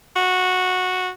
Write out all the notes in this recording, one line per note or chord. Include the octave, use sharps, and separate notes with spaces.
F#4